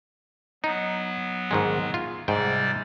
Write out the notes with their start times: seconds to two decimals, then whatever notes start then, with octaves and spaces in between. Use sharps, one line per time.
0.64 F#3 B3 D#4
1.51 G#2 D#3 G#3
1.94 F4
2.28 G#2 C3 G3 D5 G5